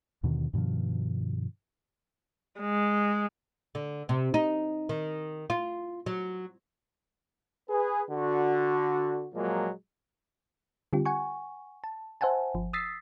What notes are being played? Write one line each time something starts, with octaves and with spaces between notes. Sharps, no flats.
D#2 B2 D3 D#3
G2 B2 D#3 F3
G#3
D3
C3
D#4
D#3
F4
F#3
G#4 B4
D3 F#4
A#2 F3 F#3 G#3 A#3
D3 G3 C4 F4 G4
F#5 G#5 C#6
A5
C5 E5 F#5 G#5 A5
G1 F3
D#6 E6 A6 B6 C7